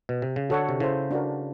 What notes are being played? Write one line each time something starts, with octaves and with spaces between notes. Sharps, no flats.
B2
C3
C#3
D3 F#4 A4 C#5 F#5
C3
C#3 E4 A4 C5
D4 F#4 A#4